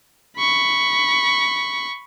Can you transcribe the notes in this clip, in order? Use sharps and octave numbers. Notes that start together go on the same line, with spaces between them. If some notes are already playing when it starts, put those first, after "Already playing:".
B5 C#6